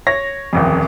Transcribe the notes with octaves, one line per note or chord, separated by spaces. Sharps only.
C#5 A#6
D#1 A1 F2